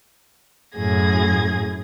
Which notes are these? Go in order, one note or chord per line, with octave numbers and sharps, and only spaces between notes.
F#2 A2 G#4 G#6 A#6